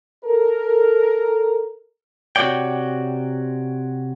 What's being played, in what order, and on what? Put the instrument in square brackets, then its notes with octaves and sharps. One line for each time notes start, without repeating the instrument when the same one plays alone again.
[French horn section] A4 A#4
[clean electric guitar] C3 F#4 C#5 D5 G5